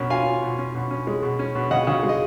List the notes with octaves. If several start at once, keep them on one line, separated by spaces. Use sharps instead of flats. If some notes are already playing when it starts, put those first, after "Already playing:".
Already playing: B2 C#4 A#4 C#5
F4 F5 G#5
F4
B2
C#4
B2
C#4
G#3
B2
C#4
B2
C#3 D#5 F#5
C#3
G#3
D#5